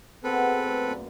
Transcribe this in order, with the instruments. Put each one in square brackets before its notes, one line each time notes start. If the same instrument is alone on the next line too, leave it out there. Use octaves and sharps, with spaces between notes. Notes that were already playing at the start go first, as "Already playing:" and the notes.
[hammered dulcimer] B3 F#4 G#4 [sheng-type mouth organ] C4 A4 B4
[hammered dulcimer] A3 D5
F#2 A#2 F4